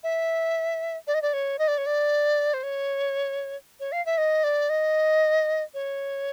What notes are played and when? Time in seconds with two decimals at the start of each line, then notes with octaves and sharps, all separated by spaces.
0.04 E5
1.07 D5
1.14 D#5
1.22 D5
1.33 C#5
1.59 D#5
1.68 D5
1.78 C#5
1.86 D5
2.54 C5
2.63 C#5
3.80 C#5
3.92 F5
4.06 E5
4.18 D#5
4.44 D5
4.70 D#5
5.74 C#5